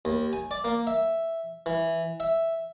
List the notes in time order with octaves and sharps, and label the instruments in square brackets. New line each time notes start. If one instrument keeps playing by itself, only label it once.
[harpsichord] D#2
G#5
D5
A#3
E5
E3
E5